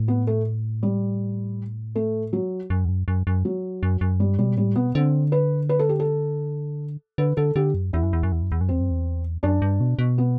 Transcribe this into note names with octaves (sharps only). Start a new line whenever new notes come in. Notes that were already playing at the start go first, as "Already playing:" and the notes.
Already playing: A2
B3
A3
G3
A3
F#3
F#2
E2
F#2
F#2
F#2
F#3
F#2
F#2
G2 G3
B2 G3
A2 G3
B2 B3
D3 C4
B4
B4
A4
G4
A4
D3 B4
D3 A4
D3 G4
F#2
E2 E4
F#2
E2
F#2
E2
F#2
E2
F#2
E2 C4
F#2
E2
F#2 D4
G2
B2
B2
B3